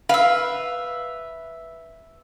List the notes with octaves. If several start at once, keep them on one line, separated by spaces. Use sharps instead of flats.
B4 E5 F5